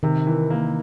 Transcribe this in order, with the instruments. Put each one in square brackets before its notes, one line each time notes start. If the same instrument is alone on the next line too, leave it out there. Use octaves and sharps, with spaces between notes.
[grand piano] C3 [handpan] D#3
[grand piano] E3
A#3